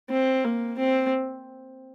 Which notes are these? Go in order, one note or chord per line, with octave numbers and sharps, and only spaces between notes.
C4
A#3
C4